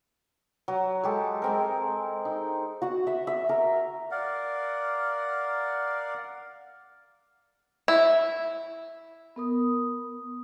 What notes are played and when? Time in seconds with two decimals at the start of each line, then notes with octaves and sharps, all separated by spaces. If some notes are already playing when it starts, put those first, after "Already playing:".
0.68 F#3
1.04 G#3 G4 A4
1.42 G#3 C4 A#4
2.25 D#4
2.82 F#4 F#5
3.07 E5
3.27 E5
3.49 A#4
4.11 A#4 D5 F5 F#5
7.88 E4
9.36 B3 A#4 D#6